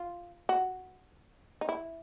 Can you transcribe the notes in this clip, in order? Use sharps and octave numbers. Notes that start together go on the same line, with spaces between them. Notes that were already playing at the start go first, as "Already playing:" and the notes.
Already playing: F4
F#4
D#4
E4